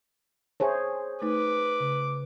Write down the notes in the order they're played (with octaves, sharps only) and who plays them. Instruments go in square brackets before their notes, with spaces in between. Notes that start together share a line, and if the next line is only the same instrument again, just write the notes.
[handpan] G#4 C5 C#5 [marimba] E5 G#5 A5
[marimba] A3 D#4 [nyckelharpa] B4 [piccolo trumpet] D6
[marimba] C#3